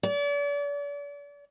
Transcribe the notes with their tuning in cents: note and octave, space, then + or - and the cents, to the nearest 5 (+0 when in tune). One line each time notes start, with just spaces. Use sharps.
D5 -40